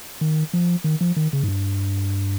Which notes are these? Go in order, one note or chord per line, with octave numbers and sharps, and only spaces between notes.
D#3
F3
D#3
F3
D#3
C#3
G#2
G2